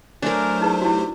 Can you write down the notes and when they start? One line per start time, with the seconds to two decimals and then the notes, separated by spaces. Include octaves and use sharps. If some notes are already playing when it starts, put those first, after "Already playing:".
0.22 F#3 A3 D4 A#4 C5 G#5
0.61 D#4 E4 G#4 B4
0.82 E4 F#4 G4